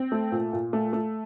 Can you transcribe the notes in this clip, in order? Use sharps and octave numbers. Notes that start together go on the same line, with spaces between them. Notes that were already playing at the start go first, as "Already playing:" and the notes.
Already playing: C4
A3
A#2
A#2
A3
A3